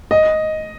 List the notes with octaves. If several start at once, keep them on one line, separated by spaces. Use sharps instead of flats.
D#5